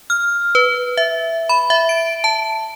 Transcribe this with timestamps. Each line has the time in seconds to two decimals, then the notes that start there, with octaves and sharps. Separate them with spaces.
0.10 F6
0.55 B4
0.97 E5
1.49 B5
1.70 E5
1.89 D7
2.24 A5